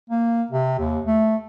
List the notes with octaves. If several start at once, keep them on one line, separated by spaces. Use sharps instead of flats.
A#3
C3
D#2
A3